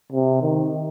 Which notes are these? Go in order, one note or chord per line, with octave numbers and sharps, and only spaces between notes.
C3
D#3